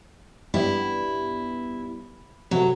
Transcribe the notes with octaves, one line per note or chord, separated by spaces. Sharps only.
G2 G3 B3 E4
C3 F#3 A3